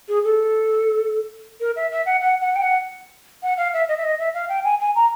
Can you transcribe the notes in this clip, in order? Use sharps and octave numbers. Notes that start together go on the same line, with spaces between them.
G#4
A4
A#4
E5
E5
F#5
F#5
F#5
G5
F#5
F#5
F5
E5
D#5
E5
D#5
E5
F5
G5
G#5
G#5
A#5